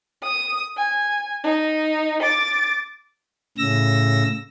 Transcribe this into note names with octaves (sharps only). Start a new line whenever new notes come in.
D#6
G#5
D#4
D6 A6
A2 C#3 E6 A#6